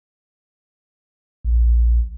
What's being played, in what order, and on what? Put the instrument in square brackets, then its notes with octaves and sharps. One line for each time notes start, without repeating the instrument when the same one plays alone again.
[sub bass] A#1